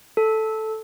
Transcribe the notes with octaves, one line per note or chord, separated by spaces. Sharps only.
A4